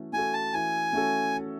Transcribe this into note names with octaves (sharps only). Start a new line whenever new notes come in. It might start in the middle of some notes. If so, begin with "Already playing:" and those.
Already playing: E3 A3 C#4 F#4
A3 C#4 F#4 A4 G#5
A5
E3 G#5
A3 C#4 F#4 A4